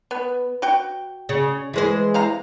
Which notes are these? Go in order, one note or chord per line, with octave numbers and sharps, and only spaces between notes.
B3
F#4 G5
C#3
E3 G#3 C5
C3 F5 A#5